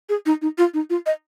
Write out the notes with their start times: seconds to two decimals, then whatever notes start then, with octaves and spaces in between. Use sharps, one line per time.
0.09 G#4
0.26 D#4
0.42 D#4
0.58 F4
0.74 D#4
0.90 F4
1.06 D#5